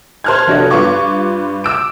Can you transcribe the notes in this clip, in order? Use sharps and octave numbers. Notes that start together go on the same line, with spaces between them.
C5 A5 F6 F#6 G#6
F1 F#3 D4 A4 C#5 D#5
G2 F4 B4 F5 C#6 D6
D6 E6 D7